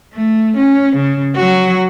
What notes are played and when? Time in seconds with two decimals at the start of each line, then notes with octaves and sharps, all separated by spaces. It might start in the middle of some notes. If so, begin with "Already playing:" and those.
0.14 A3
0.56 C#4
0.96 C#3
1.36 F#3 F#4